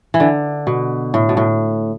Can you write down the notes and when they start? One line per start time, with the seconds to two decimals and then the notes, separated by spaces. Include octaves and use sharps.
0.14 E3
0.20 D3
0.67 B2
1.14 A2
1.29 B2
1.37 A2